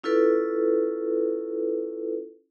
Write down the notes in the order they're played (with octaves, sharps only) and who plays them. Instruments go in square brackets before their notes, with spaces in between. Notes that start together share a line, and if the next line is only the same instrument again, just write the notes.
[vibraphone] C#4 E4 F4 A4 B4